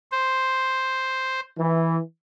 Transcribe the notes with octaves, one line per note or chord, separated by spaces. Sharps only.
C5
E3